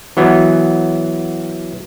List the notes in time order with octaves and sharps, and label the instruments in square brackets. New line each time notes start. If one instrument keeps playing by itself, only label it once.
[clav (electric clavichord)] E3 F#3 B3